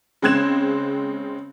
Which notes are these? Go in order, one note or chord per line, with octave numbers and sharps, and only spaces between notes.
C#3 G#3 C4 F#6 G#6 E7